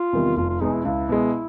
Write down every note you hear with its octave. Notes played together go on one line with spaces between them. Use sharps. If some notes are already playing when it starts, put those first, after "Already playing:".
Already playing: F4
E2 C3 D#3 G3
F1 F4
F4
E2 B2 G#3 D#4
E4
C#2 E4
B2 G#3